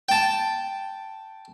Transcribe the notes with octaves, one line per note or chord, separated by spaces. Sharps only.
G5 A5